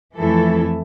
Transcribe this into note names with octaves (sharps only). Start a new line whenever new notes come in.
F2 E3 A3 E4 A4